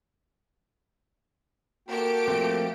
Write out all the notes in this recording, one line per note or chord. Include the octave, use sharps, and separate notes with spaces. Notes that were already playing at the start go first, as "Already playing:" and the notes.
A#3 F#4 G4 A4 G5 D7
F3 A3 C4